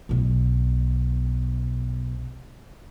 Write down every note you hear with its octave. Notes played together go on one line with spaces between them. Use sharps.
B1 B2